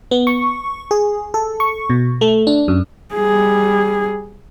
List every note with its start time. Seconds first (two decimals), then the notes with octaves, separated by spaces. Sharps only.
0.11 B3
0.27 C#6
0.91 G#4
1.34 A4
1.60 C#6
1.90 B2
2.21 A3
2.47 D4
2.68 F#2
3.14 G3 G#4